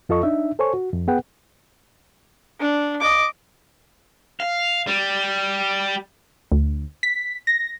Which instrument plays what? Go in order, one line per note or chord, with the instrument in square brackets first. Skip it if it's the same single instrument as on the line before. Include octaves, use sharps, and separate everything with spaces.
[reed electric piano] F2 F4 A4 D#5 C#6
D4 D#4 E5
A4 C5 C#5 G#5 C#6
F#4
F2
B3 G#4 B4 F#5 G5
[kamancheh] D4
D#5 D6
[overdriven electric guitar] F5
G3
[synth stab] D2
B6
A#6